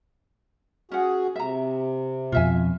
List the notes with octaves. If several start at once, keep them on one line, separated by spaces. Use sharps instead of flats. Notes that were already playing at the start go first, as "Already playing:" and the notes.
C#4 F#4 G#4 F#5
C3 E5 A#5
F2 B2 F4 E5 G#5